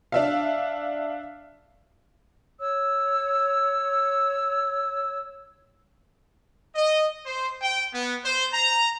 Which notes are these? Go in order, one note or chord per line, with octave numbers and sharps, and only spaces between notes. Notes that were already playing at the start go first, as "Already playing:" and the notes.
D4 E5 F5
C#5 E6
D#5
C5
G5
B3
C5
A#5